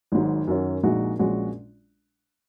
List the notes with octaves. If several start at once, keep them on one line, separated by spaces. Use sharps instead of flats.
G#1 G#2 F#3
F#2 D#3 F#3 C#4
A#1 A#2 G#3 D#4 F#4
A#1 A#2 G#3 C#4 F#4